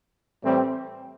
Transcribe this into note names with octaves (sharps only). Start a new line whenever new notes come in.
A2 E3 G3 C4